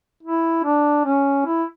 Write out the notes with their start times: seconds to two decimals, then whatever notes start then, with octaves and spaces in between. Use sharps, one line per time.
0.23 E4
0.64 D4
1.05 C#4
1.46 E4